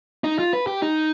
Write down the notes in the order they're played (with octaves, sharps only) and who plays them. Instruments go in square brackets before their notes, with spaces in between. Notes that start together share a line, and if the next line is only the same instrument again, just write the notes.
[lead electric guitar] D#4
F4
B4
G4
D#4